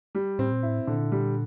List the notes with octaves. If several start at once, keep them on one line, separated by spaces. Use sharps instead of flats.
G3
A2 C4
A#2
A2 E4
A#2 D3
G3